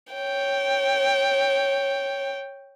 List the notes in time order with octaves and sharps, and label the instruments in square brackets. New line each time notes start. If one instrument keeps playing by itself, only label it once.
[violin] C#5 G5